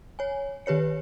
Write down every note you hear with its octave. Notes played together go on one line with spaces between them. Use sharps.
C#5 G#5
D#3 G4 B4 C#5 C#7